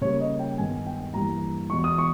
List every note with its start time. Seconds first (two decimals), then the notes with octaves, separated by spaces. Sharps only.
0.01 C#3 G3 A#3 C#5
0.20 D#5
0.39 G5
0.58 G2 D#3 G#3 B3 G#5
0.71 G#5
0.87 G5
1.00 G5
1.14 G2 E3 G3 A#3 A#5
1.70 E2 B2 G#3 C#6
1.84 D#6
1.98 C#6